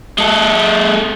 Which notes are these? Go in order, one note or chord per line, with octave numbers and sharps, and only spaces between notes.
G#3 A4